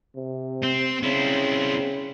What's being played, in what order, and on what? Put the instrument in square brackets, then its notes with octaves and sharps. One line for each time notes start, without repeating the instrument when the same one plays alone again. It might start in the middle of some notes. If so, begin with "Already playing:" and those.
[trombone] C3
[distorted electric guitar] C4
[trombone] C#3 [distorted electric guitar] C4 E4